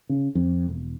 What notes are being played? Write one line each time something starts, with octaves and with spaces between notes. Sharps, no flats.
C#3
F2
E1